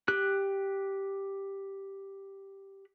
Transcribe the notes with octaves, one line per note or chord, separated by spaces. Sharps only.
G4 F#6